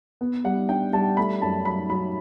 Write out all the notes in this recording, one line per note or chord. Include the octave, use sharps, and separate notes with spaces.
B3
G3 F#5
D4 G5
G3 A5
A3 B5
F#2 A5
F#3 B5
F#3 B5